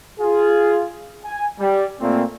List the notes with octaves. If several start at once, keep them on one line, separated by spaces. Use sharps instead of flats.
F4 G#4
G#5
G3
A#2 A3 A#3 C4